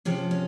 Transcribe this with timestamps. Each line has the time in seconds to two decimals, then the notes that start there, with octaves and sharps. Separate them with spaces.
0.05 C3 F3 G#3 C#4
0.31 C#4